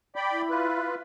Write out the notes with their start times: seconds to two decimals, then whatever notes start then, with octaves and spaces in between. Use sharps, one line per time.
0.16 D5 G5 B5
0.31 E4
0.50 F4 B4